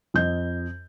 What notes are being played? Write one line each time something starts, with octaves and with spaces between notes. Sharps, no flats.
F2 D#5 G6